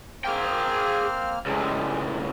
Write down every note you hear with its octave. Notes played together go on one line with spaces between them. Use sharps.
A#3 C4 G#4 G5 F6
C#2 A2 G3 G#3